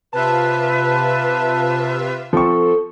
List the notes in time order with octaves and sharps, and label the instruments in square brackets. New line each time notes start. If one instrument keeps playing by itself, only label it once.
[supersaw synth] C3 F4 E5 [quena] B4 [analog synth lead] A5
[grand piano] F3 C4 C#6 [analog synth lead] A4